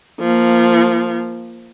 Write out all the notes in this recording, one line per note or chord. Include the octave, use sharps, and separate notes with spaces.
F3 A#3